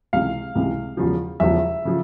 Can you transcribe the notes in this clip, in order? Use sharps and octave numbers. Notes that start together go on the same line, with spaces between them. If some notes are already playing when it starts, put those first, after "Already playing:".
C#2 C3 E3 F5
C#2 C3 E3
E1 E2 C#3 F3
E1 E2 C#3 F3 E5
C#3 F3